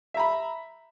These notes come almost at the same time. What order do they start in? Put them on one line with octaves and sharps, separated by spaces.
E5 A#5 B5